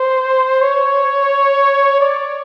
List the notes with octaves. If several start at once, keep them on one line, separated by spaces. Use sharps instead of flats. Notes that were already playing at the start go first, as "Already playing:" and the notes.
Already playing: C5
C#5
D5